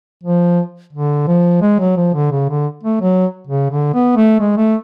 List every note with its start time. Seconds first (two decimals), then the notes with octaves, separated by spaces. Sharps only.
0.23 F3
0.93 D3
1.27 F3
1.62 G#3
1.79 F#3
1.97 F3
2.14 D3
2.32 C#3
2.49 D3
2.83 A3
3.01 F#3
3.47 C#3
3.71 D3
3.94 B3
4.17 A3
4.40 G#3
4.57 A3